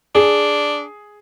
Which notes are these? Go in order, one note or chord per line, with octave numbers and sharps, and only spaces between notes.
D4 G#4